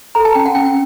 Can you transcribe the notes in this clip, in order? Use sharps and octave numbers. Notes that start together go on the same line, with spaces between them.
A4 A#5
A5
C#4 G5
F#5
C#4 G5